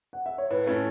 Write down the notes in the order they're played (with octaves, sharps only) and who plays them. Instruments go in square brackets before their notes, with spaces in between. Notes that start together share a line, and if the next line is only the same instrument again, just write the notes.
[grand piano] F#5
E5
C#5
[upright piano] A2 [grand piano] B4
[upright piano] A3 C#4 E4